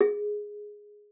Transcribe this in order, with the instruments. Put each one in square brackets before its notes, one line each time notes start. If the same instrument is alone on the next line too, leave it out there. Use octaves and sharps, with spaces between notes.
[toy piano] G#4